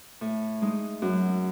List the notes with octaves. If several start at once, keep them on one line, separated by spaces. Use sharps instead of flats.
A2
G#3 D#4
F#2